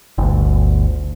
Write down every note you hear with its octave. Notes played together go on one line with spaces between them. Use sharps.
G1 D2